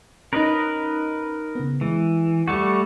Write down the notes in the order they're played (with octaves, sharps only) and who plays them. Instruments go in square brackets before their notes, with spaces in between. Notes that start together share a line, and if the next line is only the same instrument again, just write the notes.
[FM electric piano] C#4 D#4 [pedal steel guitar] A#4 B4 D#5
[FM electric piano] C#3 B3
[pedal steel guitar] E3 [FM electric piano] G#3
[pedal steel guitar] G3 A3 F#4 [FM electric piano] A6 C#7